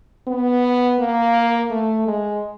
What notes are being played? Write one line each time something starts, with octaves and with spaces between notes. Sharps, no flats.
B3
A#3
A3
G#3